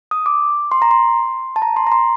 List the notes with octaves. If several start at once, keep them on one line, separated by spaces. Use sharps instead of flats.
D#6
D6
C6
A#5
C6
A5
A#5
C6
A#5
C6